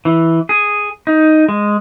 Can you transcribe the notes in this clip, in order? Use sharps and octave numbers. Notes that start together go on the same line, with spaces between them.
E3
G#4
D#4
G#3